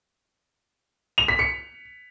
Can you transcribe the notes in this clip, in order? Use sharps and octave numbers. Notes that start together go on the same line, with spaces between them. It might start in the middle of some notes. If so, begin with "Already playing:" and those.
F7
B6
C#7